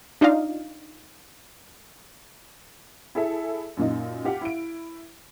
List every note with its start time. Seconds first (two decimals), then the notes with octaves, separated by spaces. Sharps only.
0.21 D4 D#4 F4 D5 D#5 F5
3.15 E4 G#4 A4 E5
3.77 F#2 A#2 D#4
4.24 F4 G4 F5 F#5
4.41 E4 D7